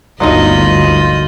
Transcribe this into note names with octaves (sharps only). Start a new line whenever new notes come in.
G1 D2 F#3 A#3 D#4 F4 D#5 B5